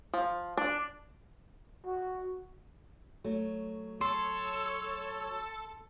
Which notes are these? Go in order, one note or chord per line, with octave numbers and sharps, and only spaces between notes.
F3
D4
F#4
F#3 A3
A4 C#5 C6